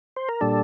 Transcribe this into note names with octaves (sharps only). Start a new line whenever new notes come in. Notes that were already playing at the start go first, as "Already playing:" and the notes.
C5
A#4
A#2 G3 D4 A4